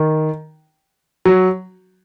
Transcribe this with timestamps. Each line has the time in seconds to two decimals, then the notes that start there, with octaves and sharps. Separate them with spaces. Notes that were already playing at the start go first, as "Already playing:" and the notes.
Already playing: D#3
1.25 F#3